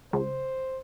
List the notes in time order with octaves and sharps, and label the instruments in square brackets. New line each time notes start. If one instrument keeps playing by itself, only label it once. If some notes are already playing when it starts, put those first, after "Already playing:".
[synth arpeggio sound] C#2 [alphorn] C5